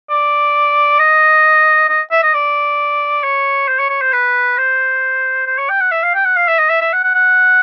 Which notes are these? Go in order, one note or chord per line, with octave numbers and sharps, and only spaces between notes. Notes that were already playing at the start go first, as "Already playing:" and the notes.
D5
D#5
D#5
E5
D#5
D5
C#5
C5
C#5
C#5
C5
B4
C5
C5
C#5
G5
F#5
E5
F5
G5
F#5
F5
E5
D#5
E5
E5
F#5
F#5
F#5